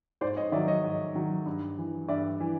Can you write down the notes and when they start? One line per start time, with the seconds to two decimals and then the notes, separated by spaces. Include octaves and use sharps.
0.21 G#2 C5 D5
0.37 C#5 D#5
0.52 D#3 D5 E5
0.56 F#3
0.68 C#5 D#5
0.84 G#2
1.15 D#3 F#3
1.46 G2
1.78 E3
2.09 G2 D5 E5
2.40 E3